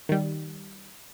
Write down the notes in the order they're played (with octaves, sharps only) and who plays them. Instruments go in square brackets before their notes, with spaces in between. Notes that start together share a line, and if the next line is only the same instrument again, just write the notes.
[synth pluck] D#3 G3